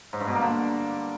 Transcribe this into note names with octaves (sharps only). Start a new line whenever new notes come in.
G#2
G2
B2
A#3
D3